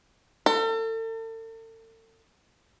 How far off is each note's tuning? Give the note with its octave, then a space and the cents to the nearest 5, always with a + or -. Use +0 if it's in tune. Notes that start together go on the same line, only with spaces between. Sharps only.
A4 +40